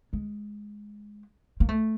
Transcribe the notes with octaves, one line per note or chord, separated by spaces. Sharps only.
G#3
A#3
A3